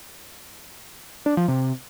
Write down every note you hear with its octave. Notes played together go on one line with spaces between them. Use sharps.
D4
F3
C3